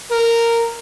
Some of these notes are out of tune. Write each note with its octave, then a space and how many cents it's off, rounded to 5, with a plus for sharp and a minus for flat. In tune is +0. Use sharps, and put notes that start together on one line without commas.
A#4 -10